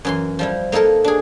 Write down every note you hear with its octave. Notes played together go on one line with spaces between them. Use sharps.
F#2 E3 C6
F3 G3 E4
A#3 D#4 E4 A4 A#4
D4 G#4